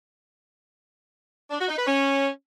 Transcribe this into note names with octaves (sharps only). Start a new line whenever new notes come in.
D4
F#4
D#4
B4
C#4